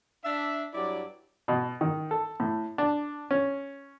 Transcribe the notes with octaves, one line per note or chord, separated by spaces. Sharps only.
D4 E5
G2 F#3 E4 D5
B2
D#3
A4
A2
D4
C#4